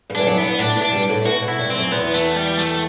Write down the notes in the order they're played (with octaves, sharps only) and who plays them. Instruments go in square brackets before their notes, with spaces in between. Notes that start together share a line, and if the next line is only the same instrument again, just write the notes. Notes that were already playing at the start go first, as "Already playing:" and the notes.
[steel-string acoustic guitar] G2 G3
[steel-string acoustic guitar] E3 [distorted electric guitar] D4
[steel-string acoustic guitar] F#2 F#3
[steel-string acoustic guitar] B2 [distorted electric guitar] B3
[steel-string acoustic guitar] A2 [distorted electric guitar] D4
[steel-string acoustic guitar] B2
[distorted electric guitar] D4
[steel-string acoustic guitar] G2 G3
A2 A3
[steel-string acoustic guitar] B2 B3 [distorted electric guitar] F#4
[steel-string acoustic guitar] B2 B3
[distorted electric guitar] E4
[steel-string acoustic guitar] G2 G3
[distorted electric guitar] C4
[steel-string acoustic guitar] F#2 F#3
[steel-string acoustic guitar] E2 E3 [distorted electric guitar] B3
[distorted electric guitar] A3
G3
A3